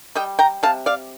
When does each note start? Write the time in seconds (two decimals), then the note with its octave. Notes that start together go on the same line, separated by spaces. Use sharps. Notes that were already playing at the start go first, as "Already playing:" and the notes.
0.15 G3 D#5 G5
0.39 G5 A#5
0.63 C3 F5 A5
0.86 D5 F5